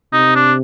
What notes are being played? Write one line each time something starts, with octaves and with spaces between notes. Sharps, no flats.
C3 D#4
D4